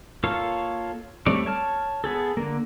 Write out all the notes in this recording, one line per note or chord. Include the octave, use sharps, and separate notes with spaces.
A#3 F4 A4 C#5 F5
G3 A3 C4 C#5 D5
C#5 A5 F6
B3 G#4 A4
D3 A#3